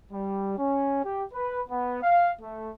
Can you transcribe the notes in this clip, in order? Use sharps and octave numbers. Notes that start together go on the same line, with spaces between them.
G3
C#4
G4
B4
B3
F5
A3